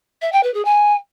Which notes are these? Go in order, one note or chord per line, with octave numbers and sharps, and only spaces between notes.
E5
G5
B4
G#4
G#5